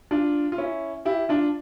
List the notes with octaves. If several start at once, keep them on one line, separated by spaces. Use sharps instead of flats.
D4 F4
F4
C#4 E4
E4 G4
D4 F4